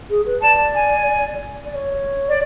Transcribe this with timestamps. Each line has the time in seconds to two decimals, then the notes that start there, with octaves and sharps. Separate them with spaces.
0.09 G#4
0.26 B4
0.42 D5 A5
0.75 G#5
1.64 D5
1.74 C#5
2.28 D5